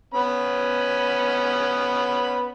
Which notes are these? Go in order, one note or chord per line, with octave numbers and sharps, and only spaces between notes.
B3 C#4 B5